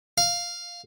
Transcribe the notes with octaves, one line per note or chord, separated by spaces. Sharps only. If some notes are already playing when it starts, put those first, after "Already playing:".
F5